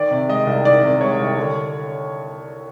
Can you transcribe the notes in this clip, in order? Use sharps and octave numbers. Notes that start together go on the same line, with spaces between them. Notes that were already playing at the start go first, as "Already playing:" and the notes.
Already playing: D#3 D5
C3
G#3 D#5
C2
D#3 D5
C3
G#3 C#5
C2
D3